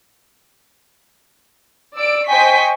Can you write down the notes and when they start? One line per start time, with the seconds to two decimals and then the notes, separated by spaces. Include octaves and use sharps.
1.95 D5 E6 D7
2.27 C5 D#5 G5 G#5 C#6 B6